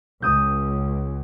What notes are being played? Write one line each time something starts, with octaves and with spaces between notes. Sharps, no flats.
C#2 D#6 G6